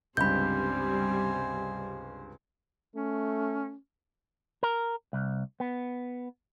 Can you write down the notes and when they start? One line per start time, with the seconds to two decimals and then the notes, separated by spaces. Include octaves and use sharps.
0.17 C#2 G2 C3 G3 C5 G#5 B5 G6
2.96 A3 C#4
4.63 A#4
5.13 C2
5.60 B3